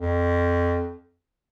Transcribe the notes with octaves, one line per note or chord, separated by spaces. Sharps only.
F2